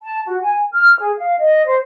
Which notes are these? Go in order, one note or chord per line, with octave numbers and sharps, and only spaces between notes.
A5
F#4
G#5
F6
G#4
F5
D#5
C5